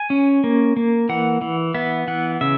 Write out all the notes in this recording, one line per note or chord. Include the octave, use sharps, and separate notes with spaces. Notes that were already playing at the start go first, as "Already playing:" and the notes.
Already playing: G#5
C#4
A#3
A#3
E3 F#5
E3
B3 E5
E3 F#5
C#3 E5